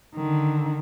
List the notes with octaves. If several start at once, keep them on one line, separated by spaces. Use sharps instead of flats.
D3 D#3